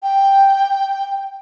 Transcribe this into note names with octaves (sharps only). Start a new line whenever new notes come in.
G5